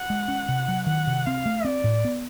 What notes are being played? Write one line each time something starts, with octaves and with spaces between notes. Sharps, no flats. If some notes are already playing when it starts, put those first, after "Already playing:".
Already playing: F#5
G#3
C#4
C3
F#3
D#3 F#5
C3
C4 F5
A3
C4 D5
A2
B3